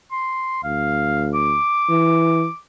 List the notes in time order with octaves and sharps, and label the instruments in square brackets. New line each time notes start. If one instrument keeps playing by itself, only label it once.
[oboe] C6
[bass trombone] D2 [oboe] F5
[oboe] D6
[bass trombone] E3